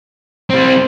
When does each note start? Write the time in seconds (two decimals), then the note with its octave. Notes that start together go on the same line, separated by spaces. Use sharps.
0.50 G3 C4 C5